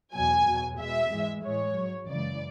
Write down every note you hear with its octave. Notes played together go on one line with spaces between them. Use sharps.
E2 B2 F#3 G#5
E2 B2 F#3
B2 G#3 E5
G#2 E3 G#3
A2 E3 G#3 C#5
G#2 F#3
F#2 C#3 E3 G#3 D5